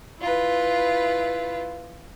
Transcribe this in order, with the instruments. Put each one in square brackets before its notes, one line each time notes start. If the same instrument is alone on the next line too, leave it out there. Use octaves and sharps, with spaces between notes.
[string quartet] E4 F4 B4